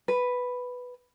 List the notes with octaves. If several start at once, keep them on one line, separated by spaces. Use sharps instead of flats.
B4